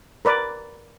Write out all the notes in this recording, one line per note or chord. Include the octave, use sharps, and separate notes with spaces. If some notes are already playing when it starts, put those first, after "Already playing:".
A#4 B4 D5